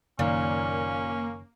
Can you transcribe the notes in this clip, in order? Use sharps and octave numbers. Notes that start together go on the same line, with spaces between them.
F#1 A#2 D#3 A#3 C#4